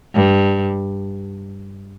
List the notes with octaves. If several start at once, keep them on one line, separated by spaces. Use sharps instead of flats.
G2